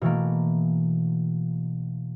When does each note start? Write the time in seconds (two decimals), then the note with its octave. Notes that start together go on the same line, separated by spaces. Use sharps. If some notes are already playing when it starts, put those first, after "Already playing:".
0.01 B2 E3 A3 A#3